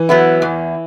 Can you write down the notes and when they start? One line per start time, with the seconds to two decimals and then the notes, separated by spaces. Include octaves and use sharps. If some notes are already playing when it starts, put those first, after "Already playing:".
Already playing: E3
0.09 F#3 B3 E4
0.42 E2